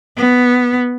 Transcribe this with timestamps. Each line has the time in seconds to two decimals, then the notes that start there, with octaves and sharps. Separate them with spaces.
0.17 B3